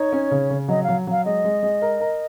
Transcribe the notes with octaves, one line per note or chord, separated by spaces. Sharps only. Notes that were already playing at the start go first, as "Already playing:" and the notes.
Already playing: D#4 C#5
C#4
C#3
C#3
F#3 D#5
F#3 F5
F#3 F5
G#3 D#5
G#3
G#3
A#4
A#4